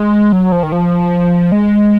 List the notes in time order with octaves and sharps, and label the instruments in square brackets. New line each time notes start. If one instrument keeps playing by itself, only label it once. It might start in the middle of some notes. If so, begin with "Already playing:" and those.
Already playing: [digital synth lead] G#3
F#3
F3
D#3
F3
G#3